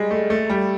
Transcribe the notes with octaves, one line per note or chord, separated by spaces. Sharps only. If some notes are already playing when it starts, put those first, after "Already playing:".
Already playing: G3 G#3
A3
A3
G3